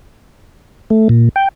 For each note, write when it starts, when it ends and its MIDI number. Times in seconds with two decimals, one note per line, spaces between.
0.90 1.08 57
1.09 1.29 46
1.36 1.48 79